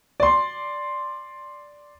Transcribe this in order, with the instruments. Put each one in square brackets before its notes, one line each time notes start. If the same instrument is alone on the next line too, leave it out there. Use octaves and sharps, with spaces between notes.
[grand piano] D5 C6